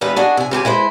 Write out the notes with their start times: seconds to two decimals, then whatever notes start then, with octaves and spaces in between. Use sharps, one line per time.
0.01 E2 G2 G#3 B3 B4
0.16 D4 F#4 G#4 D#5
0.37 C3 G#5
0.51 C#3 C4 G4 G#5
0.65 G#3 E4 B4 C5